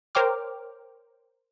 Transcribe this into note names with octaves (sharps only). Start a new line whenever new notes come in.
A#4 C5 C#5 G5 D6 F6